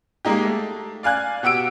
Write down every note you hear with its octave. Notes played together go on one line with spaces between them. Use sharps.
G#3 A#3 D#4 G4
A3
D5 F5 G#5 F#6 G#6
B2 G4 F#5 E6 D7